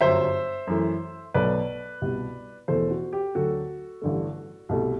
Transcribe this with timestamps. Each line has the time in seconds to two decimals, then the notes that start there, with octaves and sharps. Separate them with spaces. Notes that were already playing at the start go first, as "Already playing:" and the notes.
0.01 G1 F#2 F#3 C5 E5
0.67 F#2 E3 A3
1.34 B1 B2 F#3 A3 B4 D5
2.01 C2 B2 G3
2.68 E2 B2 A3 A4 C5
2.91 F#4
3.13 G4
3.35 D2 D3 F#3 A3 F#4 A4
4.02 A1 G2 D3 A3
4.69 C2 B2 A3